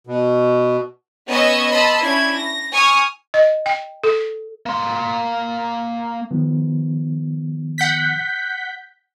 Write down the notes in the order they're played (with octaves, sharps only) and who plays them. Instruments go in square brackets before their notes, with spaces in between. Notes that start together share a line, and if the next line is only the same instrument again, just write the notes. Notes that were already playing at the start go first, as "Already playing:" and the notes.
[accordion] B2
[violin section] B3 C#4 C#5 D#5 C#6 E6
D#5 A5 B5 C6 E6
C#4 D4 E4 G#6
A#6
G#5 C#6 D#6 F6
[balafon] D#5
G5
A4
[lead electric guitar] A#3 C6
[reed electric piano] D#3 F3 B3
[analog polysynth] F#5 G6 B6